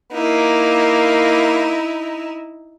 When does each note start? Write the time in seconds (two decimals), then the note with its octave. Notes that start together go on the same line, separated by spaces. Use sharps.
0.12 A#3 D#4 E4